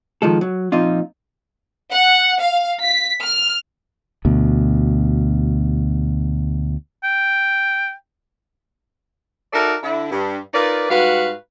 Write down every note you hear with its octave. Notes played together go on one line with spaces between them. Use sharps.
D#3 F3 G#3 A4
F#3
A#2 F3 C4 D#4 F4
F#5
F5
B6
F6
D2 B2
G5
D#4 F#4 A4 A#4 D5 E5
D3 E4
G2
D#4 F4 A#4 B4 D5
G#2 G3 F#4 B4 F5